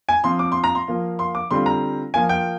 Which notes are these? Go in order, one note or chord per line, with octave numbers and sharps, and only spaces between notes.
G#5
F3 C4 F4 C6
D6
C6
A#5
C6
F3 A#3 F4
C6
D6
D3 G3 C4 F4 C6
A#5
F3 A#3 F4 G#5
G5